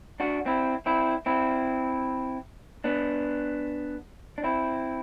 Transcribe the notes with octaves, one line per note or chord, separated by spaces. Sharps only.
D4 F#4
C4 E4
C4 E4
C4 E4
B3 D4
D4
C4 E4